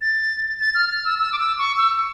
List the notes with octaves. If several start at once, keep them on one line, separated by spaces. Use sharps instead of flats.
A6
A6
F6
F6
E6
E6
D6
E6
C#6
E6